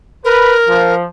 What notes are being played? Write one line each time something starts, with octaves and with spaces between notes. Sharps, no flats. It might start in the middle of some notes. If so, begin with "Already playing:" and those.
A#4 B4
F3